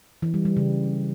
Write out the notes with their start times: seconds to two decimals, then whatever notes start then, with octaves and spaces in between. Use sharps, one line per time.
0.22 E3
0.34 G3
0.45 G3
0.57 C#3